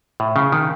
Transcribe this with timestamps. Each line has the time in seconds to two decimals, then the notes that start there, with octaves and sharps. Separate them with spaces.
0.20 A2
0.36 C#3
0.52 D#3